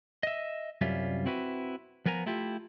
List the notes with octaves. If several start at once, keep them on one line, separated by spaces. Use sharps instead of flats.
D#5 E5
C2 F#2 G3 C#4 F4 E5
C4 E4 F#4 B4
F3 B3 A#4 G#5 A#5
A3 E4 F4 G4